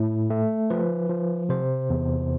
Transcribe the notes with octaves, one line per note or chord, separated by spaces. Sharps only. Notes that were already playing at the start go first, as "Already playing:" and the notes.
Already playing: A2
A3
F3 B4
F3
C3 C5
E2